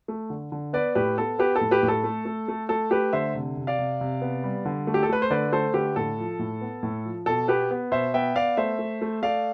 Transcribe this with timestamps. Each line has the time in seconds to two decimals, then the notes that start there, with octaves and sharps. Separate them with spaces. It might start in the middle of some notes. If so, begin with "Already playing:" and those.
0.08 A3
0.30 D3
0.52 D3
0.73 B3 B4 D5
0.95 A2 G4 B4
1.18 B3 A4
1.38 B3 G4 B4
1.56 A4
1.61 A2
1.71 G4 B4
1.83 A2
1.88 A4
2.04 A3
2.26 A3
2.48 A3
2.69 A3 A4
2.91 A3 G4 B4
3.13 D3 C5 E5
3.35 C3
3.57 C3
3.67 D5 F5
3.79 C3
4.01 C3
4.21 B3
4.44 G3
4.65 D3
4.87 A3
4.94 G4
5.03 A4
5.09 A3 B4
5.22 C5
5.30 D3 B4 D5
5.53 A3 A4 C5
5.74 D3 G4 B4
5.96 A2 A4
6.18 F3
6.39 A2
6.61 B3
6.83 A2
7.05 F3
7.26 B2 A4
7.48 B3 G4 B4
7.71 B3
7.92 B2 C5 E5
8.14 B3 E5 G5
8.36 B3 D5 F5
8.57 A3 C5 E5
8.79 A3
9.02 A3
9.23 A3 D5 F5